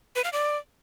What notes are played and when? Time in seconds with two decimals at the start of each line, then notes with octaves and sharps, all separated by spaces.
0.16 B4
0.24 F5
0.33 D5